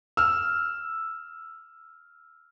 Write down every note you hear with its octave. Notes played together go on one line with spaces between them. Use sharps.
E6 F6